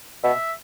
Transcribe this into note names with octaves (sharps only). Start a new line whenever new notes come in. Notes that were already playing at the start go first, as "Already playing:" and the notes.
B2 E5